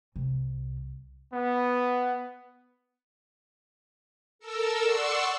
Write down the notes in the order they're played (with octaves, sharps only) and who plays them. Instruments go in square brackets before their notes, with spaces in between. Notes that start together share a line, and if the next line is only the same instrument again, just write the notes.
[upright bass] C2
[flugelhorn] B3
[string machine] A4 A#4 E6
D5 F#5 C6 C#6 E6